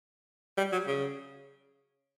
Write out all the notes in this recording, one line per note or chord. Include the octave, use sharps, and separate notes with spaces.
G3
F#3
C#3